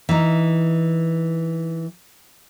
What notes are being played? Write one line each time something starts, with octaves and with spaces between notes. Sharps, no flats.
E3 D#4